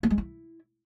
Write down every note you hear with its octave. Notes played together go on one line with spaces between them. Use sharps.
A#3
G#3
E4